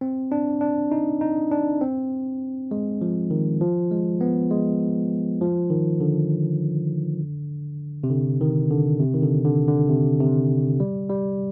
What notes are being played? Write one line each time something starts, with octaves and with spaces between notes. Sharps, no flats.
C4
D4
D4
D#4
D#4
D4
C4
G#3
F3
D#3
F3
G#3
B3
G#3
F3
D#3
D3
C3
D3
D#3
D3
C3
D#3
D3
D3
D3
C3
C3
G3
G3